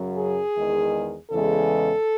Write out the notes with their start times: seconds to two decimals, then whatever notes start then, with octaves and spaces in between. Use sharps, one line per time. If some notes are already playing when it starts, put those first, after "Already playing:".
Already playing: F#2 C#3 F#3
0.17 G#4
0.56 E2 D#3 G#3
1.31 E2 C#3 E3 G#3 A4